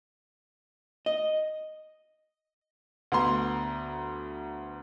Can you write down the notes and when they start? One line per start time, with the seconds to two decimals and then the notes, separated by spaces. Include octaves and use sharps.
1.06 D#5
3.12 D2 B3 A#5 C6